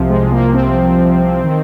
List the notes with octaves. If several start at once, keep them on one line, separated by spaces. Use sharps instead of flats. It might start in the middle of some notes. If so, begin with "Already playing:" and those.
Already playing: C2 C3 F3
G#3
A#3
C4
D#3